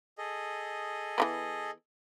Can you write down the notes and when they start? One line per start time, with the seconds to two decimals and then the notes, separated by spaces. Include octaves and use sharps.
0.18 G#4 A4 D#5
1.18 E3 G#3 B3